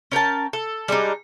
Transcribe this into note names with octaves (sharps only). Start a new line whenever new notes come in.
C#4 A#4 G5 A5
A4
G3 G#3 D4 D#4